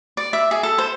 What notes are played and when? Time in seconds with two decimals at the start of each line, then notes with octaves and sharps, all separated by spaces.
0.17 D5
0.33 E5
0.51 G#4
0.63 A4
0.78 C5